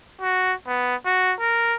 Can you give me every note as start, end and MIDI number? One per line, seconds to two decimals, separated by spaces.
0.21 0.53 66
0.67 0.95 59
1.06 1.33 66
1.40 1.76 70